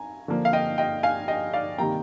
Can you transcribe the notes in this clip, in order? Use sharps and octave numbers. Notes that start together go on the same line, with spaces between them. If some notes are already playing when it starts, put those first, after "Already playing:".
Already playing: G#5 A#5
D3 F3 A#3
F5
D#5 G5
D#5 G5
F5 G#5
D#5 G5
D5 F5
C3 D#3 G3 A#3 G5 A#5